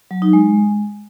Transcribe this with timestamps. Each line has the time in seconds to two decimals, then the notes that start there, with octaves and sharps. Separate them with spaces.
0.11 F#3
0.22 D#4
0.33 G#3